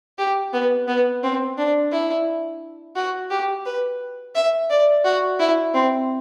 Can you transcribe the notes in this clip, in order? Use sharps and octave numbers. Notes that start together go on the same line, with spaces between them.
G4
B3
B3
C4
D4
E4
F#4
G4
B4
E5
D5
F#4
E4
C4